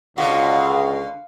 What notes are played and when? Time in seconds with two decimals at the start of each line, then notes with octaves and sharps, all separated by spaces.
0.18 C#2 B2 D3 F#4 F5